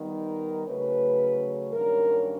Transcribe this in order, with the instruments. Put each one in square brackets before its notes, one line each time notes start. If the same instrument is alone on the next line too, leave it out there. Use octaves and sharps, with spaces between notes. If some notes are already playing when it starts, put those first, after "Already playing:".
Already playing: [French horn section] D#3 G3 B3 D#4
A#4
C#3 F#3 A3 C#4 B4
G2 D#3 F#3 A#3 C#4 A#4